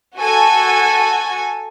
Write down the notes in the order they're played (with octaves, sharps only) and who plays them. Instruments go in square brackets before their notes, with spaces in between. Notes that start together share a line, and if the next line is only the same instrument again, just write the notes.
[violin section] F#4 A4 G#5